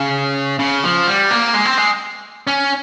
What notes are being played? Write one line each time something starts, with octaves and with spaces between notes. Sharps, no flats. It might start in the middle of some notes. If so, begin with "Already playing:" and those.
Already playing: C#3
C#3
F3
G3
A#3
G#3
C4
G#3
C#4